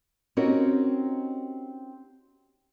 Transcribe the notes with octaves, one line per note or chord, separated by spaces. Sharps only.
C4 C#4 D#4 F#4 G4 A#4